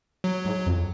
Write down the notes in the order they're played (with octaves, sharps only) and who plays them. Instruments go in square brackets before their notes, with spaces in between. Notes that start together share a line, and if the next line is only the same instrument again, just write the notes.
[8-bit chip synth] F#3
[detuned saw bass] G#2
F2